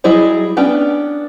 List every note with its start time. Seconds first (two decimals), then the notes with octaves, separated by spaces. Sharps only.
0.04 F#3 G3 E4 G#4 D#5
0.57 B3 C#4 D4 G5